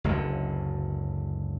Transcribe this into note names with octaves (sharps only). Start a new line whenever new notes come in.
F#1 C#2 F#2 D3